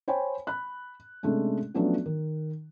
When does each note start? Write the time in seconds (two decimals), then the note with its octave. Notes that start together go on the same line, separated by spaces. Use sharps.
0.08 C5 C#5 G5 G#5 B5
0.47 B5 F#6
1.23 C3 G#3 A3 C#4 D4
1.74 F3 F#3 A3 B3 C#4 D4
2.06 D#3